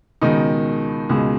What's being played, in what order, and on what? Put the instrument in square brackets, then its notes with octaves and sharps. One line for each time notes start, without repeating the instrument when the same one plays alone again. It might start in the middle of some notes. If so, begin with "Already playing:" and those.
[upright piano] C#2 B2 D#3 G#3 D#4
C#2 B2 G#3